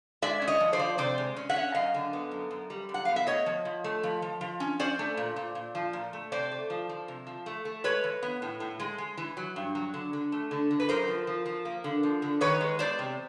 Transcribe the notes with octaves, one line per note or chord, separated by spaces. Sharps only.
G#3 D5 E5
C#4
C#5 D#5
F3
C5 D5
F3
C3 C5 D5
G#3
C#4
E5 F#5
C#4
F#2 D#5 F5
D3
B3
F#2
F#2
G3
F#2
F#5
B3 F5
E5
A3 C#5 D#5
F3
F3
A3
F3
F3
F3
C#4
C#4 C5 D5
A3
A#2
A#2
A#2
F3
A#2
A3
C3 C5 D5
A3
F3
F3
C3
F3
A3
A3
G#3 B4 C#5
E3
B3
A2
A2
G#3
G#3
E3
F#3
G2
F#3
D3
D3
A3
D3
D3
B4
F#2 A#4 C5
F3
F3
F3
A#3
D3
F3
D3
D#3 B4 C#5
G#3
E2 C5 D5
C3